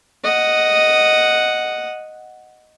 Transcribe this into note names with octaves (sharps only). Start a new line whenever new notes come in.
D#5 F#5